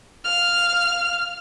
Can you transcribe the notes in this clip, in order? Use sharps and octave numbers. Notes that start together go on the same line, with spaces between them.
F5 F6